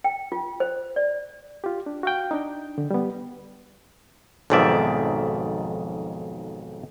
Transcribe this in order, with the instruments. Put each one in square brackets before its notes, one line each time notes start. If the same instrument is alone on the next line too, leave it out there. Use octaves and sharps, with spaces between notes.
[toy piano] G5
F4
C5
D5
[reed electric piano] F4 G4
D4
F#4 F5 G5
D4 D#4
D3
G3 B3
[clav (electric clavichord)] B1 F2 G#2 D#3 D5 E5